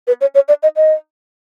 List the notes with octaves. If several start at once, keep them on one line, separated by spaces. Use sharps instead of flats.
B4
C#5
C#5
D5
D#5
D#5